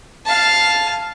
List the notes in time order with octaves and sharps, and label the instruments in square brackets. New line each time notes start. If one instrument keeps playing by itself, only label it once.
[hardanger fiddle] F5 A5